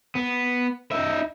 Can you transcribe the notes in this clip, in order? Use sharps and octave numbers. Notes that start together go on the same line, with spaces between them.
B3
D#4 E5